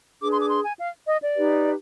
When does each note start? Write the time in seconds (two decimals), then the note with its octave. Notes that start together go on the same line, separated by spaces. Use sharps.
0.20 D4 G#4 B4 D6
0.30 C6
0.39 D6
0.48 C6
0.63 G#5
0.77 F5
1.06 D#5
1.19 D5
1.35 D#4 G4 B4